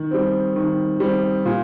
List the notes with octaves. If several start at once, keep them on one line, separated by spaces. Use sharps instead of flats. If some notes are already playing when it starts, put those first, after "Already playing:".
Already playing: D#3
G3 C4
D#3
G3 C4
A#2